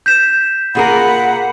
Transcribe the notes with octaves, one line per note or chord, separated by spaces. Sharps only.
G6 B6 E7
A#2 G#4 A#4 F#5 B5